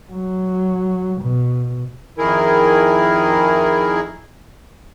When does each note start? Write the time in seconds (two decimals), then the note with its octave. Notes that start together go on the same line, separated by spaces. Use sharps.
0.12 F#3
1.21 B2
2.18 F2 D#3 E4 G#4 A#4